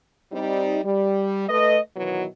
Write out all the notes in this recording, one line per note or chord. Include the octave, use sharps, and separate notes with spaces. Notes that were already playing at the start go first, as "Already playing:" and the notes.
G3 C4 D#4
G3
A3 B4 D#5
B2 D#3 E3 F#3 B3 E4